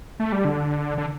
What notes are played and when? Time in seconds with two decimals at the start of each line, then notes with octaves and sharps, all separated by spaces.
0.20 A3
0.32 G3
0.45 D3
0.98 D3